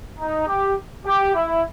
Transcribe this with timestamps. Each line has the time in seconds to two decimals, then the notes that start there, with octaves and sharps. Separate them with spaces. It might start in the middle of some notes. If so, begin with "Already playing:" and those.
0.19 D#4
0.47 G4
1.05 G4
1.34 E4